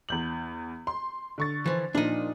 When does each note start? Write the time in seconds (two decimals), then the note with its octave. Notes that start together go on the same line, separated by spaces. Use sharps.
0.09 E2 G6 F#7
0.87 C6
1.38 D3 C#6 A6
1.66 E3 F3
1.95 A#2 F3 D4 D#4